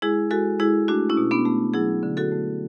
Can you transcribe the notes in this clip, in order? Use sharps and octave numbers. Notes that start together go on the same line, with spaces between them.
G#3 E4 G#4
G#3 F#4 A4
G#3 E4 G#4
A3 D4 F#4
C#4 E4
B2
B3 D4
A3
F#3 E4 G#4
D3
F#4 A4
A3